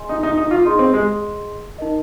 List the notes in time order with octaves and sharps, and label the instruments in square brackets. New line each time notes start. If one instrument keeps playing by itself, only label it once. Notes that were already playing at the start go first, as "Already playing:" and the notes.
Already playing: [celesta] G#4 D#5 G#5 C6
[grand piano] D#4
D#4
D#4
F4
[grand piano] D#4 [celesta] G#4 D#5 C6
[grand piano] C4
G#3
[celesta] D#4 A#4 D#5